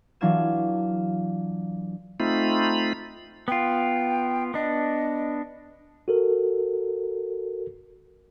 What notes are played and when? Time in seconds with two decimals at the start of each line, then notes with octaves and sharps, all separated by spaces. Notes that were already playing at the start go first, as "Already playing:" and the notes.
0.21 E3 F#3 D4 F4 G#6 E7
2.20 A3 C4 D#4 F4 B5
3.48 B3 F4 G5
4.54 B3 D4 D#5
6.08 F#4 A4 A#4